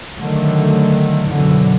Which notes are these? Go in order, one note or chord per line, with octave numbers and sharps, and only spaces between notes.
D3 D#3 F#3 A3
F#2 B2 D3 E3 F#3